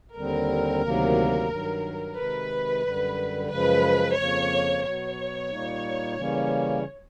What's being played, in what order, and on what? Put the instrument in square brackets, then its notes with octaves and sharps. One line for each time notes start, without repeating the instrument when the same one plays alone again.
[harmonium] D#2 D3 G3 C4 [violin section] A#4
[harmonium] D2 C3 D#3 F#3 A#3
G2 D#3 F#3
[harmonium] C3 D#3 G#3 [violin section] B4
[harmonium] F#2 D3 G3
[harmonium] F#2 C#3 F3 G#3 [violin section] B4
[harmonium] F2 C#3 F3 A#3 [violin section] C#5
[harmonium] B2 F#3 B3 [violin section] C#5
[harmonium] A#2 G3 A#3 D#4
C#3 E3 G3 A#3 C#4